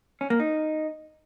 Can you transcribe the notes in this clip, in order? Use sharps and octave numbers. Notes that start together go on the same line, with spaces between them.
C#4
A#3
D#4